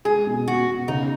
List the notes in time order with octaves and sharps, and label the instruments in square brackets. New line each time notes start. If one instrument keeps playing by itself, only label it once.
[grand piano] G#3 [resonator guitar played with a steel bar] G#4
[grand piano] B2
[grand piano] B2 [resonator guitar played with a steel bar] F#4
[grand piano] B2
[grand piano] C#3 [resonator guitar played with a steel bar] D#4